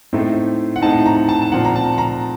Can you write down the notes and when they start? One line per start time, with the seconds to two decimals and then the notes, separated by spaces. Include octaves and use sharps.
0.13 A2 A3 C4 D#4
0.76 F#5
0.82 A2 A3 C4 D#4 A5
1.06 A#5
1.29 A5
1.42 A5
1.52 A#2 F3 C4 F#5
1.65 A#5
1.76 A5
1.98 A#5